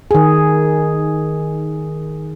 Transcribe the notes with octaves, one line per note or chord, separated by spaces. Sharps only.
D#3 G#4